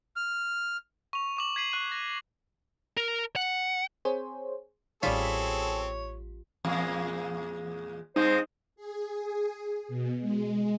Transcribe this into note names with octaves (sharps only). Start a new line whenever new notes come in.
F6
C#6 F7
C#6 D6 F#7
G#6 B6 C7 D#7 F#7
C#6 F#6 C7 D#7
A#6
A#4
F#5
C4 G#4 C5 C#5
A1 G3 C4 F4 G#4 A4 C#5 B6
E2 A#2 G#3
G2 G#3 C4 D#4 C5
G#4
B2
G#3